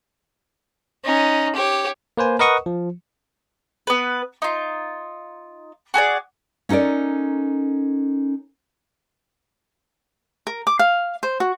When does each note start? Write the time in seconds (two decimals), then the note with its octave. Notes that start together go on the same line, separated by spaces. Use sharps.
1.04 C#4 D#4
1.55 G4 C#5
2.17 A#3 B4 C5 G#5
2.39 A#4 B4 D#5 F#5 C#6 D#6
2.66 F3
3.87 B3 B4
4.42 D#4 F4
5.94 F#4 G#4 A4 D5
6.69 C#4 D#4 A4 A#4 D5
10.47 A#4
10.67 D6
10.79 F5
11.23 C5
11.40 F#4